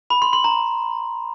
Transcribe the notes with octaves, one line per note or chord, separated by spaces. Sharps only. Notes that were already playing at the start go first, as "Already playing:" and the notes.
B5
C6
C6
A#5